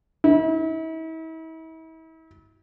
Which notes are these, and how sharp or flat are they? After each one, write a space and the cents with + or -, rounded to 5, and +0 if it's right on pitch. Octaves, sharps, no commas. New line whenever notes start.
E4 -40